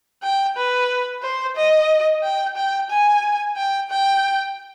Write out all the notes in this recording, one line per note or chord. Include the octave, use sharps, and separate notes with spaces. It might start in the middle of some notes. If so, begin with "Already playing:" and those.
G5
B4
C5
D#5
G5
G5
G#5
G5
G5